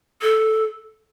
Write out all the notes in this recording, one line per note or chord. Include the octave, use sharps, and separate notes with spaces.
A4